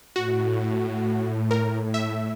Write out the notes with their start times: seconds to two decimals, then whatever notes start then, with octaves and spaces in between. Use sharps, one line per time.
0.16 A2 F#4
1.51 A#4
1.94 E5